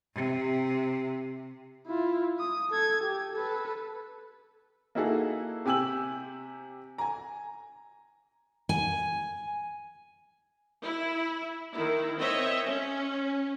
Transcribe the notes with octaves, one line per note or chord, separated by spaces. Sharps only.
C3
E4 F4
D#6
A4 G#6
G4
A4 B4
A#3 D#4 E4 F#4 G#4 A4
C3 G4 G#5 E6 F#7
G#5 A#5
G#5
E4
D#3 E4
C4 C#5 D#5 E5
C#4